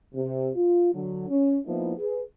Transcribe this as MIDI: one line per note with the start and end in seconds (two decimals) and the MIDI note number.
0.15 0.49 48
0.56 0.93 65
0.93 1.27 50
0.93 1.27 54
1.29 1.58 61
1.66 1.93 53
1.66 1.93 58
1.66 1.93 59
1.66 1.93 63
1.66 1.93 64
1.98 2.21 68
1.98 2.21 71